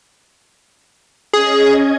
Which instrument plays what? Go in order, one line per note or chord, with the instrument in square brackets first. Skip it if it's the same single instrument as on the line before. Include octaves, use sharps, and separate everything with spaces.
[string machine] C#4 D#5 G#6 [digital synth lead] G#4